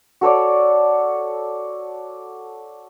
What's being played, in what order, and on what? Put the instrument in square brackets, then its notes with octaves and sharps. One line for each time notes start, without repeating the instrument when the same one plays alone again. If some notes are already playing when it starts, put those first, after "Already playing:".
[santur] F#4 A4 C#5 D5